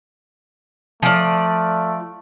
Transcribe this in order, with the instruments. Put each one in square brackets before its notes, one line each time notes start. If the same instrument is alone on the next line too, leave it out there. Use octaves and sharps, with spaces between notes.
[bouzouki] F3 D5 [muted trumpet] A3